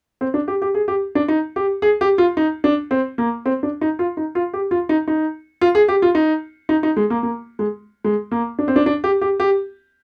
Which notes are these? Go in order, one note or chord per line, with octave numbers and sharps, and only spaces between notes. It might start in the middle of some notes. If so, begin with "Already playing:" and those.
C4
D4
G4
G4
G#4
G4
D4
D#4
G4
G#4
G4
F4
D#4
D4
C4
A#3
C4
D4
D#4
F4
D#4
F4
G4
F4
D#4
D#4
F4
G#4
G4
F4
D#4
D#4
D#4
G#3
A#3
A#3
G#3
G#3
A#3
D4
C4
D4
D4
G4
G4
G4